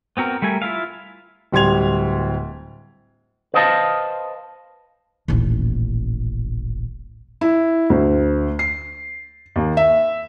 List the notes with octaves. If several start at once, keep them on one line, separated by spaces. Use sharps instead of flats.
B3 C4 F#4 A#4
G3 A3 A#4 G#5
E4 F4 E5 F5
D1 G3 C6 G#6 F7
B4 C5 D#5 F5 G#5 A5
D#1 A1
E4
D2
C7
D#2
E5